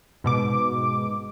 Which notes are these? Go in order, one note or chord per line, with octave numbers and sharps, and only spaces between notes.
G#2 B2 D6